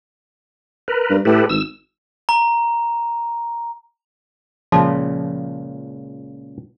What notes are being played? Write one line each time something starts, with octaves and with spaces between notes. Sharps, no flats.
A#4 B4
G2
A2 G4 A4 B4
G#1 E6
A#5
C#2 A#2 C#3 F3